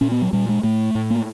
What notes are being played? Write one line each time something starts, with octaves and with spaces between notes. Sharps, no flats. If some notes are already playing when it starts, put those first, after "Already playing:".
A#2 C#4
B3
F#3
A#2 G3
G#3
A2 A3
A2
A#3